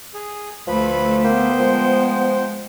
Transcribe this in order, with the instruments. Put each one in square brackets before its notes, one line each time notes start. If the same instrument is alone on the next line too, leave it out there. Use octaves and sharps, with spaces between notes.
[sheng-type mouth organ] G#4
[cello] D2 A3 [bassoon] F3 [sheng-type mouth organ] B4 B5
[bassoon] A#3 [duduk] B3 [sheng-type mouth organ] C5 G5
[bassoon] F3 [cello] G#3